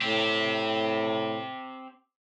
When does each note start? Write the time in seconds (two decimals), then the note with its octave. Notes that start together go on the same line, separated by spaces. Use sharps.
0.01 A2 C4 G4